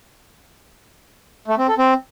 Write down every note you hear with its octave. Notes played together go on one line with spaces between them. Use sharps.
A3
C4
A4
C4